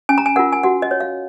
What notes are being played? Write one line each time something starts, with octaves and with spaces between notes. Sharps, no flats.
C#4 G#5
A#5
G#5
F4 A#4 F#5
G#5
F#4 F#5
D#5
C#5
F5